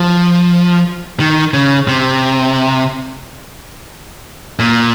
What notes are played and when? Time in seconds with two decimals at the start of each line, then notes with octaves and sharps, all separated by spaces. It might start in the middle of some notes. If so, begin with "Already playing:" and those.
Already playing: F3
1.20 D#3
1.54 C#3
1.88 C3
4.59 A#2